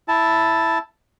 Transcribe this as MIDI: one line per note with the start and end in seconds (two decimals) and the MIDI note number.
0.08 0.78 64
0.08 0.78 81